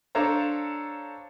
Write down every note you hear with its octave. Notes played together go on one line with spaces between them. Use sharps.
D4 A4 C5 C#5 F5 A#5